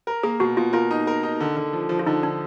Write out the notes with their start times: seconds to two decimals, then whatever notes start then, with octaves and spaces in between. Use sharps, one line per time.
0.07 A#4
0.23 A#3 G#4
0.40 B2 F#4
0.57 B2 F4
0.73 F4 A#4
0.91 D#4
1.07 A#4
1.23 D#4
1.40 D3
1.57 D3
1.73 F3
1.89 F3
1.99 F4
2.07 D3 D#4
2.23 D3 D4